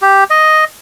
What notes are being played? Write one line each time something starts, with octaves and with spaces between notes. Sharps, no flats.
G4
D#5